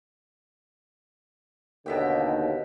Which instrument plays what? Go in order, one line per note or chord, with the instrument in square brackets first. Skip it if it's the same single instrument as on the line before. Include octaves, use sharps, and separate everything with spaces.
[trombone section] D#2 D3 [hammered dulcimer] B2 E5 G5